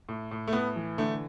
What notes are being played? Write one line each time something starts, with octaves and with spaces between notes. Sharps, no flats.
A2
A2
A3
A2 B3
E3
D3 A3